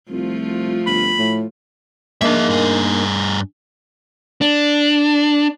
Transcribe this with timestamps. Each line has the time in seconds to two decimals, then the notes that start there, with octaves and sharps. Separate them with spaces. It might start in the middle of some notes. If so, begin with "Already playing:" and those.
0.11 C2 F3 A3 F4
0.87 G1 B5
1.18 A2
2.21 A#3 D4 D#4 G#4 E5
2.49 G2 G#4
4.41 D4